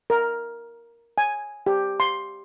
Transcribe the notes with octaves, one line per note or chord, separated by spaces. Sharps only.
A#4
G#5
G4
C6